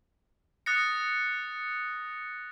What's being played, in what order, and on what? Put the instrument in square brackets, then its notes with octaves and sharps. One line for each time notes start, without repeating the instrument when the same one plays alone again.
[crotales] D#6 F#6 A6 A#6 C#7